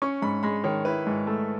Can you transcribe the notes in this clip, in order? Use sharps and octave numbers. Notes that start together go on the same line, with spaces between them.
C#4 C#6
G#2 B5
G#3 B5
D#3 C#5
E4 B4
G#2
A3